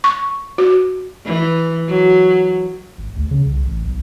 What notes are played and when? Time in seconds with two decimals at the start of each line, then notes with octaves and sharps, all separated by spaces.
0.04 C#6
0.58 F#4
1.26 E3
1.88 F#3
2.98 G#1
3.16 D2
3.31 C#3
3.45 C2
3.64 A1
3.85 B1